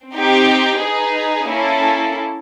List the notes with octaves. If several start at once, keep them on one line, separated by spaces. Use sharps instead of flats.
C4 D#4 G4
D#4 G#4 B4
A#3 C#4 E4 A4